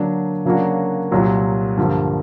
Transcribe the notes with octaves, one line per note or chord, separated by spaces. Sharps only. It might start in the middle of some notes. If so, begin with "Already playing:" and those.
Already playing: D3 F#3 A#3 D4
C#3 F#3 A#3 D4 F#4
C2 A#2 F#3
G2 D3 F3 A#3